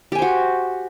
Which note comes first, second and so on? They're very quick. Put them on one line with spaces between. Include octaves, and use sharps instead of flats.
G4 G#5 C5 F#4